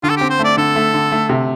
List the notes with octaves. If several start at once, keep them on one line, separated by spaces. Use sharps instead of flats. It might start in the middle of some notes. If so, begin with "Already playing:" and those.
D3 F4
A4
C4 G4
C5
A3 D5
D3 A4
A3
D3
A3
C3